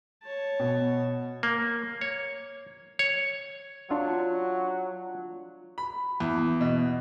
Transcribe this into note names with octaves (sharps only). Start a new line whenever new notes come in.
C#5 A5
B2
A#3
C#5
C#5
F#3 D4 F4
B5
E2
B2